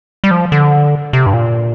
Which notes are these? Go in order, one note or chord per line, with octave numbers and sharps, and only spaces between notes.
G3
F3
D3
C3
G2
A#2